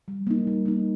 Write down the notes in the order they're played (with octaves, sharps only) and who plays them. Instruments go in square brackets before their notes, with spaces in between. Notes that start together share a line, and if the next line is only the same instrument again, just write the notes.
[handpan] G3
A#3 D#4
G3
A#3 D#4